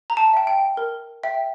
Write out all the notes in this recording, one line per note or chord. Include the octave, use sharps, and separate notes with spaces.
A#5
A5
E5 G5
G5
A#4
E5 G5